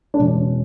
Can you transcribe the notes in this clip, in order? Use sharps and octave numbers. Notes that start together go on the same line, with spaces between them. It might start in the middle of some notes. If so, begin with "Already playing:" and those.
D4
E1 E2 B2 C#4